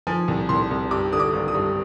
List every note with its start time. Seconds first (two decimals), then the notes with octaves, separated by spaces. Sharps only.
0.07 F3 G#5
0.28 C2
0.49 C2 C6
0.71 C2
0.91 G2 D6
1.12 D3 D#6
1.20 D6
1.33 G#1
1.48 D#6
1.54 G2